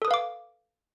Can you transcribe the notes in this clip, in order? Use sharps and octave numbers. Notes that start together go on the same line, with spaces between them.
A4 B4 F5 D6 D#6